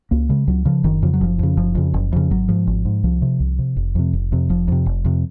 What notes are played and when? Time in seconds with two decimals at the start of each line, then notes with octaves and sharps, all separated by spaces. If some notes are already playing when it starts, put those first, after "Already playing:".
0.11 C#2 A#3
0.29 C#3 G#3
0.47 C#2 F#3
0.65 C#3 F3
0.84 F#1 D#3
1.02 F2 C#3 F3
1.14 F#3
1.21 F#1 F3
1.39 F2 C#3
1.57 F#1 F3
1.75 F2 C#3
1.94 F#1
2.13 F2 C#3
2.31 G#1 F#3
2.49 G#2 F3
2.67 G#1
2.85 G#2
3.04 C2 F3
3.22 C3
3.40 C2
3.59 C3
3.77 F1
3.95 F2 C3
4.13 F1
4.32 F2 C3
4.49 F1 F3
4.68 F2 C3
4.86 F1
5.05 F2 C3